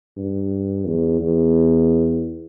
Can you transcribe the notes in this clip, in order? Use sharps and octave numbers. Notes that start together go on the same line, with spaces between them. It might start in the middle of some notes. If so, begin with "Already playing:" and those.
G2
E2
E2